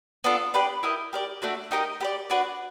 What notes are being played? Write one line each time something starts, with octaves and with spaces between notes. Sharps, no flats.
B3 D4 F4 A4
D4 G4 B4 D5
E4 G4 A#4 D#5
G4 A#4 D5
A3 D4 F#4
D#4 G4 A#4 D#5
G4 B4 D5
D4 F#4 B4 D5